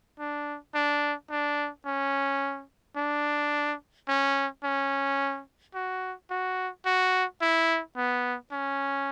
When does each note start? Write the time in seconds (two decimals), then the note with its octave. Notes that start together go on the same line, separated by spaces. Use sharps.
0.19 D4
0.74 D4
1.30 D4
1.85 C#4
2.96 D4
4.08 C#4
4.64 C#4
5.74 F#4
6.30 F#4
6.85 F#4
7.41 E4
7.97 B3
8.52 C#4